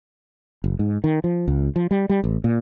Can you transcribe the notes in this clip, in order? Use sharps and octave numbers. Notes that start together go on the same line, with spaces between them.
F#1
G#2
D#3
F3
C#2
F3
G3
G3
A1
A#2